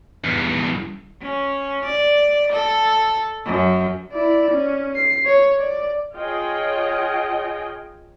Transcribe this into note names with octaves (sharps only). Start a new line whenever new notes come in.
E2 G2
C#4
D5
A4
F#2
E4 D5
C#4
C7
C#5
D5
F4 G#4 C#5 D#5 G5